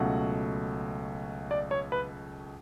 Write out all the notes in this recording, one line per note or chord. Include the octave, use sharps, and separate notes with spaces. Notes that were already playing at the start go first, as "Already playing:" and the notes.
Already playing: C#2 B2 F#3 A3 F#5
D5
C#5
B4